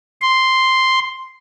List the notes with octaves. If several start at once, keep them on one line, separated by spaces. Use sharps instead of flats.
C6